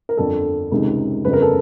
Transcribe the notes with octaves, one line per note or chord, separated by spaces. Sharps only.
A#4
G1 F2 D3 A4
C#2 C3 D#3
G1 F2 C#3 B4
A#4
A4